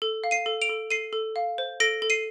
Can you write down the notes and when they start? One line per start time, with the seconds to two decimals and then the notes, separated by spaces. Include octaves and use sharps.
0.02 A4
0.24 F5
0.31 C7 D#7
0.46 A4
0.62 D7 F7
0.69 A4
0.90 A4 C7 D#7
1.13 A4
1.36 F5
1.58 C5
1.80 A4 A#6 D7
2.02 A4
2.10 C7 D#7